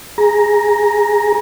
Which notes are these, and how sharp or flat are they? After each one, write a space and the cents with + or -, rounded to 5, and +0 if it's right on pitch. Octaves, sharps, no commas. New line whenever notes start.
G#4 +0 A#5 +10